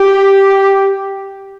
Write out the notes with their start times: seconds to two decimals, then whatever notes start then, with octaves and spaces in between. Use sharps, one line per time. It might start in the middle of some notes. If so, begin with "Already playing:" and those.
Already playing: G4